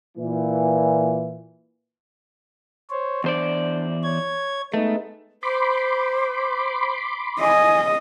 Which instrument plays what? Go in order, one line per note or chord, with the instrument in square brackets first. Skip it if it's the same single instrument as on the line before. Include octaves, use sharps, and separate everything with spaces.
[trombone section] A#2 E3
[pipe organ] C5 C#5
[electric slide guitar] E2 C5 D5 [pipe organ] D4
[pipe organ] C#5 G#6
[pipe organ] G#3 B3 D#4 [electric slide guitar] A3
[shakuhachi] C5 [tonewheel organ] B5 C6 D6
[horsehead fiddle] D#5 [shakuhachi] G#5